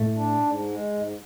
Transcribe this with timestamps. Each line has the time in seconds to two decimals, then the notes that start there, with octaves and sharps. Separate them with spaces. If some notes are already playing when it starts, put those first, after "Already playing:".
Already playing: A2 A3
0.15 D4
0.41 G#2
0.66 G#3
0.91 G#2